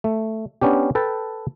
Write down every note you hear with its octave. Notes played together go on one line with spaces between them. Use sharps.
A3
B3 C#4 D4 G4
A4 B4 G5 A5